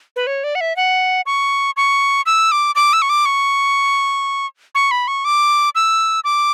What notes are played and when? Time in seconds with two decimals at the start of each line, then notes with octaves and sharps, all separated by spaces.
0.16 B4
0.27 C#5
0.44 D5
0.55 F#5
0.61 E5
0.76 F#5
1.26 C#6
1.77 C#6
2.26 E6
2.52 D6
2.75 D6
2.93 E6
3.02 C#6
3.09 D6
3.25 C#6
4.75 C#6
4.91 B5
5.08 C#6
5.25 D6
5.75 E6
6.24 D6